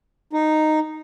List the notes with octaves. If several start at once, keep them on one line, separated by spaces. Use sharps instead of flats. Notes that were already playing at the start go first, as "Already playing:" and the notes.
D#4